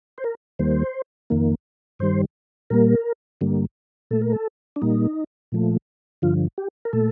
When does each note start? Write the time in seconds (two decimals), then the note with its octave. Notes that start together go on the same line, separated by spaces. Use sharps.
0.18 C5
0.24 A#4
0.59 D#2 D#3 G3 A#3 C5
1.30 F2 D#3 A#3
1.99 G2 D#3 G3 C5
2.70 A#2 G3 A#3 A#4
3.41 G2 D3 G3 A#3
4.11 A#2 A3 A4
4.21 A#4
4.33 A4
4.76 D4
4.82 A#2 G3 A#3 D#4
5.52 A#2 F3 A3
6.22 G2 D3 F3 F4
6.58 G4
6.85 A#4
6.93 A#2 A3 A4